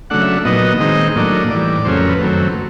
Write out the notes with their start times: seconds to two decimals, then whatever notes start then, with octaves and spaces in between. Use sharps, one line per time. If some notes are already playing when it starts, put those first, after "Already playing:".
0.10 C#3 F#3 A3 D4 F#5
0.22 E5
0.45 A#2 F#3 B3 D#4 D#5
0.80 D#3 G#3 C4 D#4
1.16 A2 F#3 A#3 D4
1.50 A2 E3 G3 D5
1.85 F2 C#3 F#3 A3 C#4 C5
1.97 A#4
2.09 B4
2.21 F#2 D#3 F#3 A3 C4